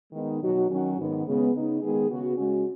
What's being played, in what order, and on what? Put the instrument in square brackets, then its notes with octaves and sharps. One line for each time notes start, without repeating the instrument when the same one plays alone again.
[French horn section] D#3 G#3 B3 D#4
B2 F#3 D#4 F#4
D#3 F#3 C#4 F#4
G#2 D#3 B3
C#3 G#3 B3 G#4
C#3 B3 D#4
D#3 G#3 B3 G#4
C#3 B3 F#4
C#3 G#3 C#4 F#4